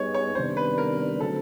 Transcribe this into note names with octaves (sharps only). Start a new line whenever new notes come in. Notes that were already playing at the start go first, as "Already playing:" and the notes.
Already playing: G3 B3 D#4 G#4 C#5
C#5
C3 D#3 G3 B3 D4 C5
B4
A#4
D3 F#3 A3 C4 A4